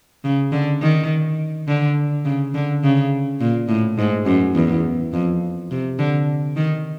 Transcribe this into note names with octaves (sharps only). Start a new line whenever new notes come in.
C#3
D3
D#3
D3
C#3
D3
C#3
A#2
A2
G#2
F#2
E2
F2
C3
D3
D#3